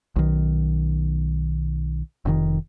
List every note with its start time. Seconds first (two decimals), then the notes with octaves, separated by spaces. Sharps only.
0.16 B1 D#3
2.25 F1 B2 D#3